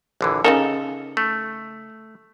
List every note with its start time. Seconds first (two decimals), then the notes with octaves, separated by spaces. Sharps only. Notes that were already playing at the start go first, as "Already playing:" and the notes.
0.21 A#1 D3 E3
0.45 C#3 D#4 A4 A#4
1.17 A3